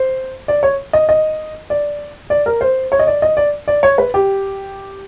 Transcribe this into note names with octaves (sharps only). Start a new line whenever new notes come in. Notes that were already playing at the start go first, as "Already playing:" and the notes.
Already playing: C5
D5
C#5
D#5
D#5
D5
D5
A#4
C5
C#5
D#5
D5
D#5
D5
D5
C#5
B4
G4